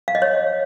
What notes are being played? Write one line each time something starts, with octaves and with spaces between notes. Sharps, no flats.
F5
D#5
C#5